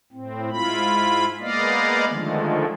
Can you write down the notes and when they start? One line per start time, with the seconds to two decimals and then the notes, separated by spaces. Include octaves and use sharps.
0.12 A2 C4
0.50 G#2 E4 F4 B5
1.40 G#3 A#3 B3 D5 D#5 F5
2.08 D3 D#3 F3 G#3 A3